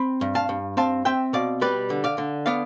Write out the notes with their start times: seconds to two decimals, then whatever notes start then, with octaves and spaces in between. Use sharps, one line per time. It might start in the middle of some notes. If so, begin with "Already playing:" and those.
Already playing: C4 B5
0.21 G2
0.35 F5 A5
0.49 G2
0.77 C4 F5 A5
1.05 C4 E5 G5
1.33 B2 D5 F5
1.61 G3 B4 D5
1.90 D3
2.04 D5 F5
2.18 D3
2.46 B3 D5 F5